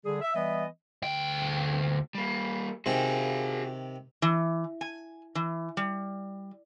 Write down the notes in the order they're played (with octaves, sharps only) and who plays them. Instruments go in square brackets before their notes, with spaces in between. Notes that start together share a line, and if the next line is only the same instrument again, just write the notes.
[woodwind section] D3 G3 G#4
E5
E3 G3 B3 D#5 E5
[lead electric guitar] D2 G5
G3 A#3
[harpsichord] C3 D#3 G5 [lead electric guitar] F#4 G#4
[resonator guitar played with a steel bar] E3
G#5
E3
G3